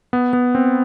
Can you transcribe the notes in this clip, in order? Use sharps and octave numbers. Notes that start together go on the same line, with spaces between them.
B3
B3
C4